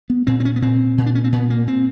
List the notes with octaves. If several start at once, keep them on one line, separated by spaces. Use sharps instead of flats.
B3
A#2 C4
C4
C#4
B3
A#2 C4
A#2
D4
C#4
C4
A#2 B3
A#3
A#2 C4